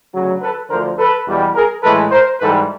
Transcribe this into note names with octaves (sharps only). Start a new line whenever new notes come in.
D2 C#3 F#3
A4 B4
D2 D3 F3 A#4 C5
A4 B4
E2 B2 G3
G#4 A#4
A2 E3 G#3 A4 B4
A#4 C5
G#2 E3 G3 A4 B4